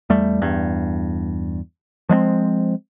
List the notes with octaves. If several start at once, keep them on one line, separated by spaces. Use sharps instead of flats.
E2 G3 A3
E2 G2
F3 G#3 A#3 C4